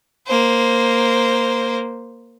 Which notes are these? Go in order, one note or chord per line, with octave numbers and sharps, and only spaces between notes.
A#3 C5